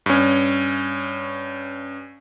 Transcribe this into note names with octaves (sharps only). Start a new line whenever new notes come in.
G2 C#4